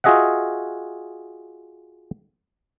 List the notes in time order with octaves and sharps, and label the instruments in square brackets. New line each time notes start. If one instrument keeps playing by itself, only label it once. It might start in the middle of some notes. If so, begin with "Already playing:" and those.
[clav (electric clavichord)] F4 F#4 G#4 D#5 E5 F#5